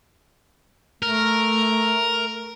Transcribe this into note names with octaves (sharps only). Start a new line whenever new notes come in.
A3 A#4